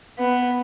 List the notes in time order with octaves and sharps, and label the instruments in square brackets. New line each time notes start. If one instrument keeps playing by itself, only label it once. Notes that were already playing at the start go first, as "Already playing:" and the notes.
[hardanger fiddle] B3